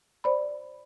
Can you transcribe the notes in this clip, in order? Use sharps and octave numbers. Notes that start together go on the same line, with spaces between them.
C5 D5 B5